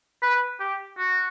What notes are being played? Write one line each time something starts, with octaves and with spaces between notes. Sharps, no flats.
B4
G4
F#4